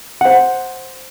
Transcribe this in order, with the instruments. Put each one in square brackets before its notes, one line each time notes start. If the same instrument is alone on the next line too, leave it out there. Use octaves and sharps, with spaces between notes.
[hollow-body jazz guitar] C5 F#5